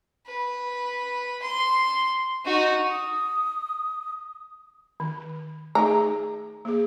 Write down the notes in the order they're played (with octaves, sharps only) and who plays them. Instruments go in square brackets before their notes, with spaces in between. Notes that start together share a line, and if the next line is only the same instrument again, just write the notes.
[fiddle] B4
C6
D#4 F#4
[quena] D#6
[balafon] D#3
[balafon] A3 D#4 G#4 [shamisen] A#5
[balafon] A#3 G#4